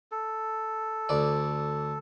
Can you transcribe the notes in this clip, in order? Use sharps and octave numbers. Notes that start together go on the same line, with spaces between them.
A4
D2 D5